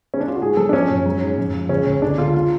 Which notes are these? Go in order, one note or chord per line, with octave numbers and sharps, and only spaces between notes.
C#4
D4
F4
F#4
G#2 G#4
F#3 A4
D4
F3 C#4
F#2
F#3
G#2
F#2
F3
C#3 C#4
C#2
D3 D4
D3 F4
F4